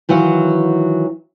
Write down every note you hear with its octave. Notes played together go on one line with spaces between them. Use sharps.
D#3 E3 F#3 F4 F#5